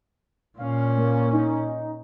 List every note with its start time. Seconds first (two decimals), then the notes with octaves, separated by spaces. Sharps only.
0.58 A#2 C#4 F5
0.97 A#3
1.33 D#4